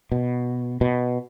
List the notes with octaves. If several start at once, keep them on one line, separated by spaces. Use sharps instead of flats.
B2
B2